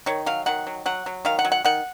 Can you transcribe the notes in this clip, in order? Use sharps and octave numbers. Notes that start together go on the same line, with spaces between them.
D#3 C#5
F#3 F5
D#3 F#5
F#3
F#3 F#5
F#3
D#3 F5
F#5
F#3
F#5
D#3 F#5